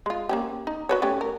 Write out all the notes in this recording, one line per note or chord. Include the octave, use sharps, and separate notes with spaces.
G#3 F4
A#3 C#4 G4
D#4
F#4 B4 C#5
A3 C#4 G4
A#4